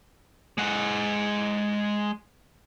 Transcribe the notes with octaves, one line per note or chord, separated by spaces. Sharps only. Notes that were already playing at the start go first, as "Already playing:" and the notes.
G#3 F#5